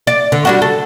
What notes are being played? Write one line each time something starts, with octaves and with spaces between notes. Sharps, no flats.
D5
D3
G3 D4 F#4
A4